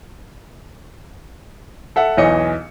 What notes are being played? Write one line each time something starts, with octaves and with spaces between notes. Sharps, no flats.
A4 E5 F#5
B1 E2 E3 C#5 D#5 C#7